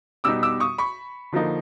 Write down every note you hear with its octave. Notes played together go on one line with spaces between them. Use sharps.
B2 G3 B3 D#4 D6 E6
D6 E6
C#6 D#6
B5 C#6
D3 F3 A#3 D#4